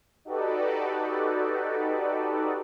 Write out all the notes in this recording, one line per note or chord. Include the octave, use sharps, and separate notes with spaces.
D#4 F#4 G4 A4 B4 D5